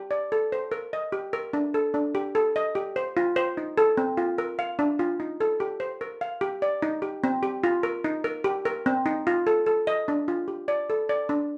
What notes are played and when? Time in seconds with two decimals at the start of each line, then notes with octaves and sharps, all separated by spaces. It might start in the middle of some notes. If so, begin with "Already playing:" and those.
Already playing: G4
0.11 D5
0.32 A4
0.52 C5
0.72 A#4
0.93 D#5
1.12 G4
1.33 A#4
1.53 D4
1.74 A4
1.94 D4
2.15 G4
2.35 A4
2.56 D#5
2.75 G4
2.96 C5
3.17 F4
3.36 C5
3.57 D#4
3.78 A4
3.97 C4
4.17 F4
4.38 A#4
4.59 F5
4.79 D4
4.99 F4
5.20 D#4
5.41 A4
5.60 G4
5.80 C5
6.01 A#4
6.21 F5
6.41 G4
6.62 D5
6.82 D#4
7.02 G4
7.24 C4
7.43 G4
7.64 F4
7.83 A#4
8.04 D#4
8.24 A#4
8.44 G4
8.65 A#4
8.86 C4
9.06 D#4
9.27 F4
9.47 A4
9.66 A4
9.87 D#5
10.08 D4
10.28 F4
10.48 G4
10.68 D5
10.90 A4
11.09 D5
11.29 D4